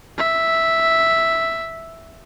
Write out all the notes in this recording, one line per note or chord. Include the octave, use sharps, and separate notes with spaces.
E5